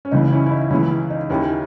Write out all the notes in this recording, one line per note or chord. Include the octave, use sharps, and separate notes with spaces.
C#4
C#2 C#3 E3 D#4
C#4 E4
E4
D#4
C#2 C#3 E3 C#4 E4
D#4
D#2 D#3 C#4 E4